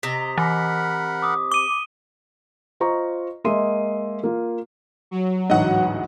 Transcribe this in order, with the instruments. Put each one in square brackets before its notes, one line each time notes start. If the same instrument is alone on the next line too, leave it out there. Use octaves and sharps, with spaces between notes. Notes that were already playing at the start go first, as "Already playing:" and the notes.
[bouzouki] C3 D#5 A#5 [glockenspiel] B6
[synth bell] E3 [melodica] A#4 F#5 B5
[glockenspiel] D6 D#6
[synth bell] D6 [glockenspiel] D#7 G7
[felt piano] F4 C5 D#5 A#5 C#6
G#3 A#3 D#5 E5 C6 D#7
A#3 F4
[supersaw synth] F#3
[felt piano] A1 D2 G#2 [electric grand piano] D#5 F#5